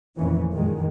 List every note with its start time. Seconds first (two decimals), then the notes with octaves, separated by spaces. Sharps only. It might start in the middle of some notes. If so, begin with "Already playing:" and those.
0.17 F1 F2 A#2 D#3 E3 C#4
0.53 F#2 A#2 D#3 G#3